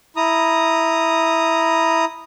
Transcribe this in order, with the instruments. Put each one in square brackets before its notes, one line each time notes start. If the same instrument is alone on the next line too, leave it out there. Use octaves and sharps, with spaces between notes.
[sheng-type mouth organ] E4 A#5 D#6